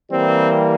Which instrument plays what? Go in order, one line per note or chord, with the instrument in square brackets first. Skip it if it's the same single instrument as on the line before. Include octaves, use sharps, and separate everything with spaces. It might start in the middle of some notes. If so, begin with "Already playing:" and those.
[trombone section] E3 G3 A#3 C4